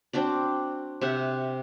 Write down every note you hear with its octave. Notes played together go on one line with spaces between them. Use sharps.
C4 D4 F#4 D5
C3 E5 F#5